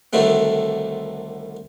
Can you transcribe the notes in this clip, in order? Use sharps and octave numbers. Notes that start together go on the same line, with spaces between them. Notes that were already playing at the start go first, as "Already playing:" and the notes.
C2 D3 D#3 F#3 A3 C4